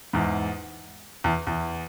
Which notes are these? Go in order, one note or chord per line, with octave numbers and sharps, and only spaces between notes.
E2 G#2
E2
E2